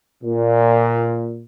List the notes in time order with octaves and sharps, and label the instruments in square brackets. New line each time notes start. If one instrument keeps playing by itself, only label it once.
[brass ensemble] A#2